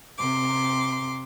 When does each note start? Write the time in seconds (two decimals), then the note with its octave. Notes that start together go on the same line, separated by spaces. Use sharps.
0.20 C3 C6 D6